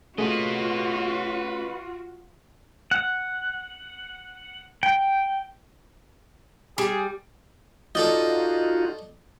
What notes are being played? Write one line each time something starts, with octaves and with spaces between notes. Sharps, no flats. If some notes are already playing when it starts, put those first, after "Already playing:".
A3 C#4 F4 F#4 G#4 B4 D#5
F#5
G5
G3 G#4
D#4 F4 F#4 A4 D5 D#5